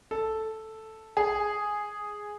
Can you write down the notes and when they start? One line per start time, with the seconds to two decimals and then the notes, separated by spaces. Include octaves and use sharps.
0.11 A4
1.17 G#4